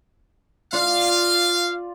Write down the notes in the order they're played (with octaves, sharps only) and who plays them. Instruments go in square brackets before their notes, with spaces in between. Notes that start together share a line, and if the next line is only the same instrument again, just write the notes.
[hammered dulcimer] F4 D5 [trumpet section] F5